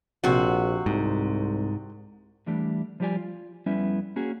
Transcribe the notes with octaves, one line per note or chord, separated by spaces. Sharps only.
A#1 C3 F#4
C2 G#2
E2 E3 G3 A3 D4
F3 G3 F4 G4 D5 G#5
F4
F2 G3 B3 C#4 E4 E5
A#3 C#4 F#4 G#4